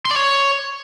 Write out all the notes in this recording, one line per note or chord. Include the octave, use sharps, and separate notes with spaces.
C6
D5
C#5